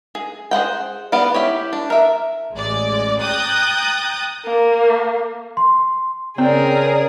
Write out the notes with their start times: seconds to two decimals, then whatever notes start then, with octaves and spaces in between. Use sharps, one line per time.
0.15 G#4
0.51 G#4 C5 F#5 G5
1.12 B3 D5 F5
1.34 E4 G4 C#5
1.73 D4
1.90 A#4 E5
2.54 A1 G#3 D5
3.20 G5 A#5 D#6 F#6 G6 A6
4.46 A#3
5.57 C6
6.38 C#3 C4 G#4 A#4 D5